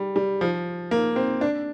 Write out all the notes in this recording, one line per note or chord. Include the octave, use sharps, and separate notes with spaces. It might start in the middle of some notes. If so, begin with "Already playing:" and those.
Already playing: G3
G3
F3
A#3
C4
D4